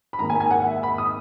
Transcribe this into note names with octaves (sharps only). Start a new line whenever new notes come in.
B5
G#1 G#2 D#3 A#3 A#5
G#5
G#5
F#5
E5
B5
D#6